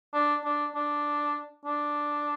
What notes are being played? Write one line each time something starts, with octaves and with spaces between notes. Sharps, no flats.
D4
D4
D4
D4